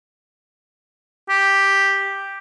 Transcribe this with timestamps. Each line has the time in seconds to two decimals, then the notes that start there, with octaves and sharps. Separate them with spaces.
1.29 G4